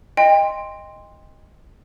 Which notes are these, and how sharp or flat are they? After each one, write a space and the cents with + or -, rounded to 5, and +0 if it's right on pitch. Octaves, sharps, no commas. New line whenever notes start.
D#5 +0 G5 +35 C6 +0